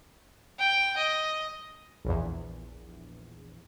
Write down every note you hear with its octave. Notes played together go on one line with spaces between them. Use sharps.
G5
D#5
A#1 E2